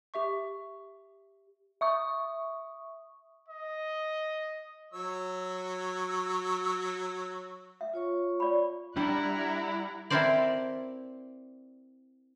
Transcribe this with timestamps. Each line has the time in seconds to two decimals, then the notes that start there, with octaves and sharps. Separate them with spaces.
0.14 G4 E5 C#6
1.81 E5 C#6 D#6
3.48 D#5
4.94 F#3 C#5 E6
7.81 E5
7.93 F4 C#5 C#6
8.40 D5 B5
8.97 G3 D4 E4 F#5 A#5
10.10 C4 E4 A4 A#4 C5 D5